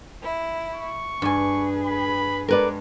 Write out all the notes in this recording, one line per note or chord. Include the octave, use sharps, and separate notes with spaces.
E4
C#6
G2 G#4 B4 G#5
B5
G2 G#3 A#4 B4 D5